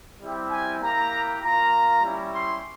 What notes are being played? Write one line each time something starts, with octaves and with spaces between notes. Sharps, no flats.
G3 C4 E4 G4
G#5
A#3 E4 G4 A#5
A#3 F4 A#5
G3 C#4 E4 G4
C6